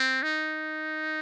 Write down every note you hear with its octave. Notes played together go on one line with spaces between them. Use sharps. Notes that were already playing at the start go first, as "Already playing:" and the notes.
Already playing: C4
D#4